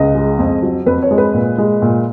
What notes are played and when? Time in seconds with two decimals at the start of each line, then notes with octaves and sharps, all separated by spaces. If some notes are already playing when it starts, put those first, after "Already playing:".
Already playing: C#2 D#5
0.15 G#3
0.39 F2
0.63 F#3
0.86 F2 B4
1.02 C#5
1.11 G#3
1.18 B4
1.34 A#2
1.58 G#3
1.82 A#2